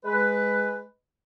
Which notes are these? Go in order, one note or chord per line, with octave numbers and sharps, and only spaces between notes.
G#3 B4